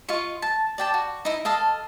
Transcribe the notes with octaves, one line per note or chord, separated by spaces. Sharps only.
F4 D#5 F5 C#6
A5
D5 G5 A5
F#4
D#4 E4
A4 D#5 F5